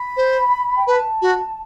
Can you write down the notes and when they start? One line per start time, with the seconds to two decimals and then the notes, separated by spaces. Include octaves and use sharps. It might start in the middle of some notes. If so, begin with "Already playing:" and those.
Already playing: B5
0.17 C5
0.75 G5
0.87 B4 A5
1.22 F#4